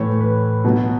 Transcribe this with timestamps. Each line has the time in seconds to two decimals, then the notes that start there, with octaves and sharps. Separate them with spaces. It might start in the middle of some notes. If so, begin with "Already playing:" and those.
Already playing: A2 E3 A3 C#5
0.21 B4
0.65 B2 F#3 B3